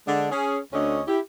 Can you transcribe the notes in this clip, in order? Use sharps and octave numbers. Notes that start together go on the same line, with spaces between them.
D3 G#3 D4
C#4 G#4
D2 D3 C#4 C#5 D#5
E4 G4